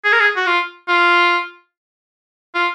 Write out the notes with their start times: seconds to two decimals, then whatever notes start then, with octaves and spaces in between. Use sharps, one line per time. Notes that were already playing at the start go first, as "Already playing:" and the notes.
0.04 G#4
0.12 A#4
0.20 G#4
0.36 F#4
0.46 F4
0.88 F4
2.55 F4